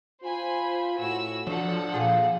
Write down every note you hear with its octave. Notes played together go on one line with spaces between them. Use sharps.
F4 C5 G#5 B5
A2 F#4 E6
F3 F#3 D4 A4 F#5
A#2 F4 G#4